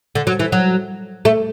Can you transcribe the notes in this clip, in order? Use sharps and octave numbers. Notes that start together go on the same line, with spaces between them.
D3
F#3
E3
F#3
A3